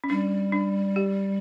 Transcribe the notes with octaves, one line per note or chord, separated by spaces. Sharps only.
C#4
G3 D4
D4
G4